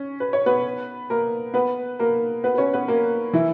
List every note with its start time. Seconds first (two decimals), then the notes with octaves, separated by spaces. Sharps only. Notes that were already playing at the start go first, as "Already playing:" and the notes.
Already playing: C#4
0.20 B4
0.33 C#5
0.46 B3 B4
1.10 A#3 A#4
1.54 B3 B4
2.00 A#3 A#4
2.44 B3 B4
2.54 B4
2.58 C#4 C#5
2.73 B3 B4
2.88 A#3 A#4
3.33 E3 E4